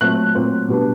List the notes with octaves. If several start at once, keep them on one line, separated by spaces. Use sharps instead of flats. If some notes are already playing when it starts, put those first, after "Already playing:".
A#2 F#3 A3 C4 F#6
A#2 F#3 A3 C4
B2 G3 B3 D4